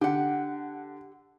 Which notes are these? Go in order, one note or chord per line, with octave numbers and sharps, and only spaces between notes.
D3 G4 F#5